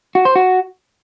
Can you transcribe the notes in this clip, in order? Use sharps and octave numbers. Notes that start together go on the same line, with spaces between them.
F#4
C5
F#4